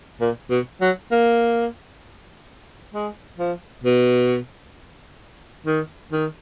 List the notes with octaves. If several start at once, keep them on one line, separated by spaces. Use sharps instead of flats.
A#2
B2
F#3
A#3
G#3
F3
B2
D#3
D#3